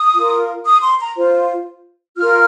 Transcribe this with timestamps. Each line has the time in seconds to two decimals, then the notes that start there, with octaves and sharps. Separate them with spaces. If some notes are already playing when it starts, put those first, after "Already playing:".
Already playing: D#6
0.15 F4 A#4
0.65 D#6
0.82 C6
1.00 A#5
1.16 F4 C5
2.16 F4 A#4 F6